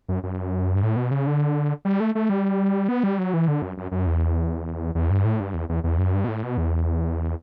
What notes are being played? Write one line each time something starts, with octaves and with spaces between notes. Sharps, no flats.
F#2
F#2
G2
A2
B2
C#3
D3
G3
A3
A3
G3
B3
G3
F#3
E3
D3
F#2
F#2
F#2
E2
E2
G2
A2
G2
E2
E2
E2
F#2
G2
B2
A2
B2
E2